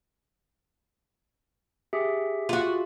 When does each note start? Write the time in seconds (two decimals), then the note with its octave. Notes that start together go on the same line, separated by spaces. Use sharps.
1.93 G4 G#4 E5
2.49 F4 F#4